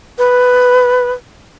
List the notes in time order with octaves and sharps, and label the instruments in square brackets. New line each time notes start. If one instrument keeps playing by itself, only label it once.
[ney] B4